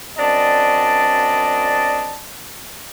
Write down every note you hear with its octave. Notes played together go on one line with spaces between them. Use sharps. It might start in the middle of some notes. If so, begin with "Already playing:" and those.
F#2 C4 D4 D5 D#5 A5